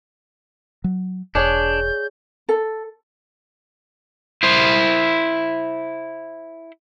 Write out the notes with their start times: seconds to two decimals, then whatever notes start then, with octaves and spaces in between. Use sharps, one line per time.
0.84 F#3
1.35 E1 D4 G#4 C#5 D5 G6
2.49 A4
4.43 E4 C5